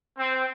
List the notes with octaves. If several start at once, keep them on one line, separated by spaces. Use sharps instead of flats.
C4